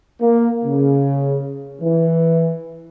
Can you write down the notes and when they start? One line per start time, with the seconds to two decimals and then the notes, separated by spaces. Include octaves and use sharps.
0.21 A#3
0.65 C#3
1.81 E3